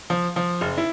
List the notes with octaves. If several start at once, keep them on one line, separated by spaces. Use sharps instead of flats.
F3
F3
F#1
E4